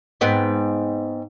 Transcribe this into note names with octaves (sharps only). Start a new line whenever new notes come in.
G#2 B3 C4